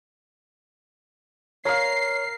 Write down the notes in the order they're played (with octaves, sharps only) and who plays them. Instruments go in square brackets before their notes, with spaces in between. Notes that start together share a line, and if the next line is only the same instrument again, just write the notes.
[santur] A#4 F5 [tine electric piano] C#5 [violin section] C7